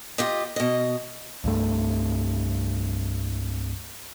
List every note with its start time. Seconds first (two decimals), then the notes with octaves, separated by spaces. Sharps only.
0.18 F4 G4 D#5
0.56 B2 D#5
1.44 C2 G2 A3